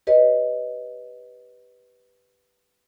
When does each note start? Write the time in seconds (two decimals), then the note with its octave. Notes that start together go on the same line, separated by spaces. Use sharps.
0.07 G4 B4 C#5 D#5